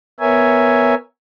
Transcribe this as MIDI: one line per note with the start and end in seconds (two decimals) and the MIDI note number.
0.20 0.95 59
0.20 0.95 70
0.20 0.95 73
0.20 0.95 76
0.20 0.95 80